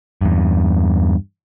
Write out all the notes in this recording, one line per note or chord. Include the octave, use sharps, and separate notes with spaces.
E2 G2